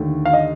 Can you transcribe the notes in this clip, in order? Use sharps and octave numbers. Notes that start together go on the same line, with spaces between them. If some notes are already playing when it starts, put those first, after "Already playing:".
Already playing: D#2 D3 A3
F5
D#5